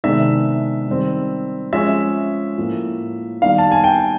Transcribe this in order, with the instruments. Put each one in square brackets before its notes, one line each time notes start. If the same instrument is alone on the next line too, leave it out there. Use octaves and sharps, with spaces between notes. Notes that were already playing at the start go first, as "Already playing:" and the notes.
[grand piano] C3 D#3 G#3 B3 D4 E5
D#3 G3 C4
F3 G#3 C#4 E5
A2 F3 A#3
D#3 G3 B3 D4 F5
A5
G#5
G5